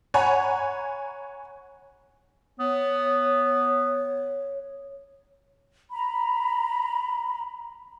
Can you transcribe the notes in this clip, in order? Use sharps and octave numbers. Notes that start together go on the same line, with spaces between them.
C#5 F#5 G#5 A#5 B5
B3 C#5
A#5 B5